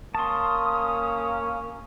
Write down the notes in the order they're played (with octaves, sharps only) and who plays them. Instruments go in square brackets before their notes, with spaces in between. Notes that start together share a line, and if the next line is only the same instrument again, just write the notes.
[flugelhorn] A#3 [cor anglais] C#4 [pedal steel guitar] A5 C6 [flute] D#6